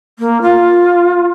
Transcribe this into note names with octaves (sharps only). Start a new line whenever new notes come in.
A#3
F4